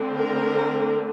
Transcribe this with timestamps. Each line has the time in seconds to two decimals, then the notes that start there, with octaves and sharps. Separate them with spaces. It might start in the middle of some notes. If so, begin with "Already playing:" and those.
Already playing: D3 A3 C4
0.15 A#4